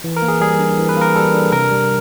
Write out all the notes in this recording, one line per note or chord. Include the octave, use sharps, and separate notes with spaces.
E3
A#4
A#3
G#4
G3 G#4
D4
E3
B4
A#3 A#4
G3 A4
D4
C3 A#4
G3